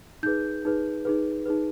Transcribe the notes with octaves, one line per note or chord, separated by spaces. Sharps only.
D#4 G#4 B4 G6
D#4 G#4 B4
D#4 G#4 B4
D#4 G#4 B4